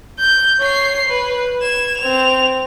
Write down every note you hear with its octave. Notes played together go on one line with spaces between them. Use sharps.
G6
C#5 C7
B4
G#6 E7
C4 F7